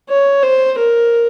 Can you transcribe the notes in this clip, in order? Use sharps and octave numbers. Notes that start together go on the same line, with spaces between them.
C#5
C5
A#4